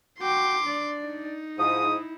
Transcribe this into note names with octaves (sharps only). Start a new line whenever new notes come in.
F#4 G5 C6 D6
D4 D5
D#4
G#2 F3 E4 D#6